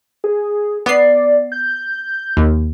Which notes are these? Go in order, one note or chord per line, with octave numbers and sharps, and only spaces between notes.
G#4
B3 D5 C7
G6
D#2